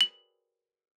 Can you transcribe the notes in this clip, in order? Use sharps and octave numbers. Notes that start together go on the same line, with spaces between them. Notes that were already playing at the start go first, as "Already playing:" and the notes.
F#7